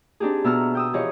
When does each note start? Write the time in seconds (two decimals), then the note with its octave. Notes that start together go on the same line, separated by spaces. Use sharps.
0.20 C4 D4 D#4 G4 G#4
0.44 B2 B3 E5 A#5 E6 F6
0.75 G5 D#6 E6
0.93 E3 F3 G4 G#4 C#5 D#5